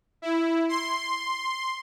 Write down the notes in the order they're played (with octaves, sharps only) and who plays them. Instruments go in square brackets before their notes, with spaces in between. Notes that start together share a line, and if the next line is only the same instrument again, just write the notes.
[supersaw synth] E4
C6